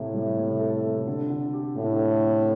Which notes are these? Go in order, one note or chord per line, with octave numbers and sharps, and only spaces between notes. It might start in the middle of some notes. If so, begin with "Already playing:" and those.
Already playing: A2 C3 E4
G3
C3
A4
C3
D3
D3
G4
A2 D3
C4
C4